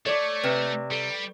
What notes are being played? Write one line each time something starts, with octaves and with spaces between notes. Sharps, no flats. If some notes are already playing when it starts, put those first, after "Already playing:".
A3 A4 C#5 D5
C3 B4
G3 A4